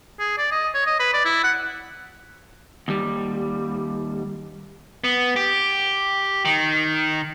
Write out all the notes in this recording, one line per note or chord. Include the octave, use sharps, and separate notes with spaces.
G#4
D5
D#5
C#5
D#5
B4
D5
E4
F#5
D#2 G3
B3
G4
D#3